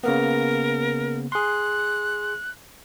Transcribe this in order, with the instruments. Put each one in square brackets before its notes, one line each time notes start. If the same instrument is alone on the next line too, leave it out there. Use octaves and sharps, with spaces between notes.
[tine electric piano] C#3 A#3 B3 [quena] A#4
[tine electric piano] G#4 C6 [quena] F#6